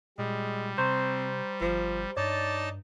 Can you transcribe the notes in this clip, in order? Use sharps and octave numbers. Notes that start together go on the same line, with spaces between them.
A#2 G3 G#3
C3 C4 C5 A#5 C#6
G1 F3
G2 D#4 C#5 D5 A5